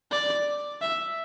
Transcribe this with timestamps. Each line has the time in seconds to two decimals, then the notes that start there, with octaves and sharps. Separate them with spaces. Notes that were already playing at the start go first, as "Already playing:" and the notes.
0.11 D5
0.82 E5